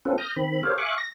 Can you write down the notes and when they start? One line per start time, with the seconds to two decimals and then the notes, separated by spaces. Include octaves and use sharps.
0.05 C4 C#4 F4 A4 B4
0.18 D#6 F6 G6 A#6
0.36 D#3 C4 B5
0.63 G4 A4 A#4 C5 C#5 F5
0.78 E5 F5 G#5 C#6 D6 F#6
0.98 A#6